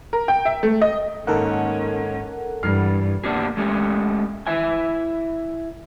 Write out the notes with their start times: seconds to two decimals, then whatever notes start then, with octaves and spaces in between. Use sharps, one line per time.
0.13 A#4
0.28 G5
0.45 E5
0.63 A3
0.82 D#5
1.27 G#2 D#3 A#3 C#4 A4 A#4 F#5
2.63 G2 E3 F6 C7
3.24 B2 A#3 D4 D#4 G4 G#4
3.57 G#3 A3 C#4 G4
4.47 E4 E5 G#5